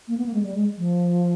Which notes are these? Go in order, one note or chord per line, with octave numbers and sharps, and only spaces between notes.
A#3
B3
A#3
G#3
G3
G#3
F3